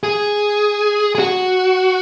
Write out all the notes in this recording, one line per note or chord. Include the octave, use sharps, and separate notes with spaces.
G#4
G#4
F#4